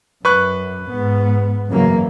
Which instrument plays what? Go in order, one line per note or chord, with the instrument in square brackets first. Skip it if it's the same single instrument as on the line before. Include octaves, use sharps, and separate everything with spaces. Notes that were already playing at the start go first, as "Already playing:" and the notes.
[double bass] F#2 [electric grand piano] B4 C#6 F#6
[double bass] G#2 B3
[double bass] F#2 E3 [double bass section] C#3 F#3 A#3